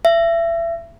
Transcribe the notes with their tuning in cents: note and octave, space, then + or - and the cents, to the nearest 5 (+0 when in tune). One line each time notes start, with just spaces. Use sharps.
E5 +30